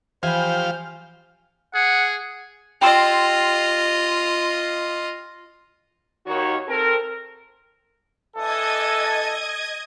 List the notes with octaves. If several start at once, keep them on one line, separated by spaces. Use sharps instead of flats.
E3 F3 G4 C5 F5 G#5 B5
G#4 F#5
F4 G4 D#5 C6 E6
D#2 D#3 D#4 F#4 C#5
C4 A4 A#4
E3 D4 A4 D#5 D#6 G#6